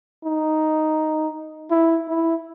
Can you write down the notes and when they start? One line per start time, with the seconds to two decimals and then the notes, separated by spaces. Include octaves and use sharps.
0.25 D#4
1.71 E4
2.09 E4